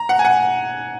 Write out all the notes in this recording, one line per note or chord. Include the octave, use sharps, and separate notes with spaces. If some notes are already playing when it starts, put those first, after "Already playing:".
Already playing: A#5
F#5
G#5
F#5